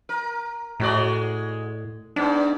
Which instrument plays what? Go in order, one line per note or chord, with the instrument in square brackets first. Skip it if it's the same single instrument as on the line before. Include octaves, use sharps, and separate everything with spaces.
[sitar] A#4
[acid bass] A2 [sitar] G#3 F#4 D5
[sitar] G#2 B3 [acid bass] D4